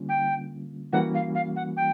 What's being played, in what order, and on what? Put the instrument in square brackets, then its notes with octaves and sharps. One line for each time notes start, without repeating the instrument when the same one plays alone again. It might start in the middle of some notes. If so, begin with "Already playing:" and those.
Already playing: [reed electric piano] D3 G3 A#3 C#4 F4
[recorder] G5
[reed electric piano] E3 G3 A#3 C#4 F#4 [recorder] F#5
[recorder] F5
F5
F#5
G5